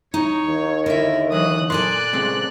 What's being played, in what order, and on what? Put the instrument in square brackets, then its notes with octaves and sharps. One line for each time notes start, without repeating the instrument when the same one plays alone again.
[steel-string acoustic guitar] D#4 [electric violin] C#5
[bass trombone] D#2
[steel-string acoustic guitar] D3 E5 [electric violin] E4 A#4
[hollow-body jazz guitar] E3 F#3 [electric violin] D#6 F#6
[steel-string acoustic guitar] A#2 A4 G#5 [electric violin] D5 F#6 [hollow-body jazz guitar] C6
[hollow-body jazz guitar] C#3 G#3 C4